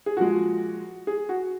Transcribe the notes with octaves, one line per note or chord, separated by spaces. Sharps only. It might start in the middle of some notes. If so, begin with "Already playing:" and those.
G#4
A#2 F3 G#3 F#4
G#4
F#4